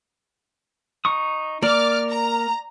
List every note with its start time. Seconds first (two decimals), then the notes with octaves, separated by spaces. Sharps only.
1.05 D#4 C#6 D#6
1.63 A#3 A#4 D5 D6 F6
2.09 A#5